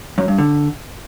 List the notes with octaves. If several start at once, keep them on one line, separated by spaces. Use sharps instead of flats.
F#2
G2
D3